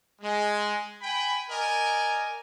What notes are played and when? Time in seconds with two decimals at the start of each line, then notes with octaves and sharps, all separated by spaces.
0.21 G#3
1.01 G5 G#5 B5
1.50 A#4 D5 D#5 G#5